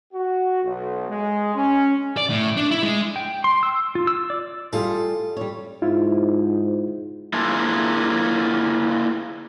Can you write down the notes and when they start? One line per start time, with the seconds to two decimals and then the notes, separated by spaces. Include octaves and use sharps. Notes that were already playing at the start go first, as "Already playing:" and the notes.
0.14 F#4
0.63 B1
1.09 G#3
1.55 C#4
2.17 D5
2.30 A2
2.57 D4
2.71 E4
2.83 G#3
3.16 G5
3.44 C6
3.63 E6
3.95 F4
4.07 E6
4.30 D5
4.73 G3 F4 G#4 A4
5.37 G3 C#5
5.82 G#2 E4 F4
7.33 A#3 D4 E4 F4 G#4 A4